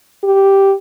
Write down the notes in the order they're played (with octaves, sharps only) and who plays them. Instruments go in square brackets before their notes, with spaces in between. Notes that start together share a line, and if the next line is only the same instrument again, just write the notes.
[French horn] G4